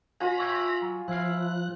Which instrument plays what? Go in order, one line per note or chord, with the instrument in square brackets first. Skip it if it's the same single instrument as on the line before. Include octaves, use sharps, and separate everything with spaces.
[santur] F4 G#5 [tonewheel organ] A#5 B5
[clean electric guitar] E4 G4 C#5
F#3
[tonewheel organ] F3 F#6 [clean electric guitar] E4 F5